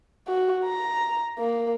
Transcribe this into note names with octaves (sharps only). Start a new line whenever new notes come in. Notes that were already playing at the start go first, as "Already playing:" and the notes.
F#4
A#5
A#3